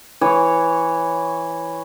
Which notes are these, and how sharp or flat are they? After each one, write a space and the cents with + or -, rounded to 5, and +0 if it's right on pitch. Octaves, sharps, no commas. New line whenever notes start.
E3 +0 C#5 -5